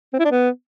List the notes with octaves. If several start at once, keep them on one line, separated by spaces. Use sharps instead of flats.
C4
E4
D4
B3